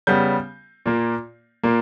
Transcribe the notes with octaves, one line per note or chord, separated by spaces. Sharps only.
C#3 G3 B3 G6
A#2 A#3
A#2 A#3